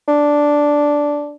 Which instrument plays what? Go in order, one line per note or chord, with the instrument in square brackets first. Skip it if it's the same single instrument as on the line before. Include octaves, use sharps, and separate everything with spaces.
[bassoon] D4